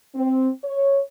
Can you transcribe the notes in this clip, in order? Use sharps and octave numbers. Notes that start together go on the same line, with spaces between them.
C4
C#5